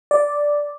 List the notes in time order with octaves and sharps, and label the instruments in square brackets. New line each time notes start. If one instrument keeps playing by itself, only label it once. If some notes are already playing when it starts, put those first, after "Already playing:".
[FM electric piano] D5